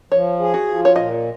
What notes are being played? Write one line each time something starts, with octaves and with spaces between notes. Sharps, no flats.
F3 C#5
G#4
F#4
F3
C#5
A#2 D#5